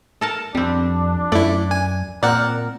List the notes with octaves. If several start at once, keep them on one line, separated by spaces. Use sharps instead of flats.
A4 A#4 A5
F2 G3 C4 D4
F#2 A3 E4 D5
G#5
A#2 C4 A#4 D5 F#5